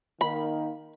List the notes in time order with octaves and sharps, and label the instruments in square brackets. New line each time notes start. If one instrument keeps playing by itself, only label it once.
[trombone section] D#3 A#3 D#4 [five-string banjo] B5